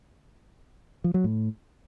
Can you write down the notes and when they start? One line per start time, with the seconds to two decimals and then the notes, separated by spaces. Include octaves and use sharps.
1.04 F3
1.14 F#3
1.24 A2